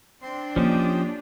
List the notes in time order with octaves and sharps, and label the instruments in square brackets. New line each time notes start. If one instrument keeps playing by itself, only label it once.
[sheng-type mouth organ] C4 C6 [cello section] D4
[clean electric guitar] F3 C#4 [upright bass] A#3 [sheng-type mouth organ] G4 C5 D#5